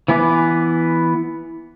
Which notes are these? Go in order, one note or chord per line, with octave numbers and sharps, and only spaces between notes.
E3 B3 G#5 D6